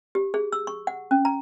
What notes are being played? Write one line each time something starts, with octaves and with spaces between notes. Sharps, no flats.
G4
G#4
E6
C#6
F#5
C#4
A#5